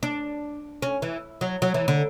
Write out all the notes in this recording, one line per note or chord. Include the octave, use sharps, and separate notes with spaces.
D4
C#4
E3
F#3
F#3
E3
D3